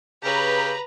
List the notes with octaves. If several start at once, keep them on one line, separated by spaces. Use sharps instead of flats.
C#3 G4 B4 A#5